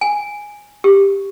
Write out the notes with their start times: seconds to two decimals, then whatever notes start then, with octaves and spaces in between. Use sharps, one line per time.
0.01 G#5
0.84 G4